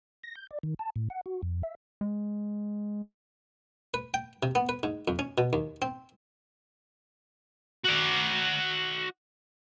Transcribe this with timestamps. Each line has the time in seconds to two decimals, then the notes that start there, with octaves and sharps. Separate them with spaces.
0.23 A#6
0.35 G6
0.51 D5
0.63 D#3
0.79 A5
0.96 A2
1.10 F#5
1.26 F#4
1.43 F2
1.63 E5
2.01 G#3
3.94 B4
4.14 G5
4.43 C3
4.55 B3
4.69 B4
4.83 G#2
5.08 F2
5.19 C#4
5.38 B2
5.53 D#2
5.82 C4
7.85 F#4 D5